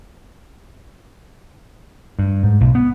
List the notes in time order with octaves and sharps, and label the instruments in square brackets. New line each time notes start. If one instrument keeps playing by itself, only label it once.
[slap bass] G2
G#2
B1
B3